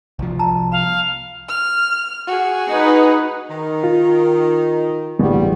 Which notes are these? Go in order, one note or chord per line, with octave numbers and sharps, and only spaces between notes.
C2 F3
A5 A#5
F5 B5
F6
F#4 G#4
D#4 B4
D#3
F4
A1 D2 G3 G#3